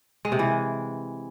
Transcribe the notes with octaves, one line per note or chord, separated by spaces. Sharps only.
G#3
C3
E3